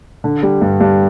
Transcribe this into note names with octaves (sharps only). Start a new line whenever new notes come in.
D3
G3
G2
G2